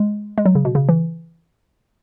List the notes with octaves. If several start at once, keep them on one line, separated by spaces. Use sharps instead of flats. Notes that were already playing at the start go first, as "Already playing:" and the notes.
Already playing: G#3
G#3
F#3
C#3
B2
C#3
E3